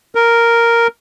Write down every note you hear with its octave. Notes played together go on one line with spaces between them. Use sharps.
A#4